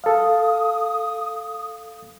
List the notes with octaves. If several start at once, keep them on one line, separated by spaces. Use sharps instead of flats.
A4 F5 D#6